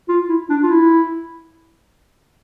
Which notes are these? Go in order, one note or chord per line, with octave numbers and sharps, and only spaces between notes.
F4
E4
D4
F4
E4